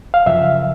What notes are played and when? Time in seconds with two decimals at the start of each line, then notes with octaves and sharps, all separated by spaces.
0.14 F5
0.26 F#2 C#3 F3 E5